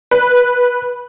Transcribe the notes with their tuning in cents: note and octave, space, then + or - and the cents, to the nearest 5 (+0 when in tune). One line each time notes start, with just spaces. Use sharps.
B4 -10